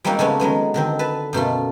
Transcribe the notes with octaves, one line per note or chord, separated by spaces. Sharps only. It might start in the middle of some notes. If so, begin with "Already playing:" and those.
G3 G#3 A#3 C4 D#4 F#4
C#3 G#3 A3 B3 C#4
D#3 F#3 G#3 B3
D3 D#3 C4
B4 A5
F#2 B2 A3 F4